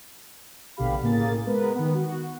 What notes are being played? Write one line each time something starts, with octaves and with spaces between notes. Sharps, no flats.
A#1 B2 D3 G4 F5 B5
A2 C#3 A#3 G#4 A6
G#3 B3 A#4 B4
D#3 B3
F#4